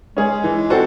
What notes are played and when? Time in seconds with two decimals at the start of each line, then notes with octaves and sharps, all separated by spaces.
0.17 G#3 C#4 G#4
0.44 E3
0.70 C4 F#4 A4